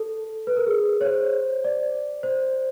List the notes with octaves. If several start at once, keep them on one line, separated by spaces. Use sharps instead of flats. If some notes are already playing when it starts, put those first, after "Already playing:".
Already playing: A4
B4
A#4
G#4
C#5
C5
D5
C5